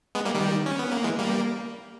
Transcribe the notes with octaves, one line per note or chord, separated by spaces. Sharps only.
G#3 B3
G3 A#3
D#3 G3
C#4
B3
A#3
E3 G#3
G3 A#3